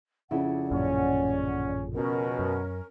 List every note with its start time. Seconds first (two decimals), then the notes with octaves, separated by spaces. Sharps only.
0.31 F2 C#3 E4 D5 F#5
0.71 A1 F#2 A#2 C#4
1.94 B2 C#4 A#4
2.39 F#2